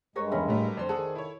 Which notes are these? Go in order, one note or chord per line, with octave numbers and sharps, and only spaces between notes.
G2 G#3 A#4 B4 C#5
E2 C#4 A4 A#4 E5 B5
A2 F#3 G3 A3
F2 D3 C5 D5 C6
D#3 G#4 A4 F#5
E4 C#5